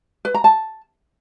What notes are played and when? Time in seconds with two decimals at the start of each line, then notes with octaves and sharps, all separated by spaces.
0.25 B4
0.34 A#5
0.44 A5